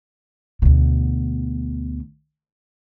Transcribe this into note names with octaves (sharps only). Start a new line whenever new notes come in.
D2 B2